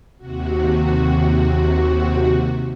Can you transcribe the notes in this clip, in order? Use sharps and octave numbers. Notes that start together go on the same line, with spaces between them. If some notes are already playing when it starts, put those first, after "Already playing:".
D#2 C3 F#4